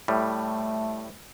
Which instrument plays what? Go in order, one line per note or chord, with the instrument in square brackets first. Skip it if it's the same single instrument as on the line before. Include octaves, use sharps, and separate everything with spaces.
[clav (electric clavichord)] A2 G3 [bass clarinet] A3